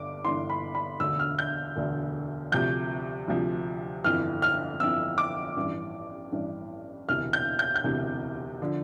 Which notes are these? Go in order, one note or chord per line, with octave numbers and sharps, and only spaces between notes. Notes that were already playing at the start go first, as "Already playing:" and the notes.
Already playing: G1 G2 D6
G1 G2 E3 C6
B5
B5
E1 D2 D3 E6
F6
G6
E1 D2 D3
D2 C3 F3 G6
D2 C3 F3
G1 F2 E3 F6
F6
G1 F2 E3 E6
D6
A1 G2 E3
A1 G2 E3
E1 D2 C3 E3 F6
G6
G6
G6
E1 D2 C3 E3
D3 F3